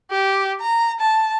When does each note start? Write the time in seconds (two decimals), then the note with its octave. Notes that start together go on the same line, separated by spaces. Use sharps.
0.11 G4
0.61 A#5
1.00 A5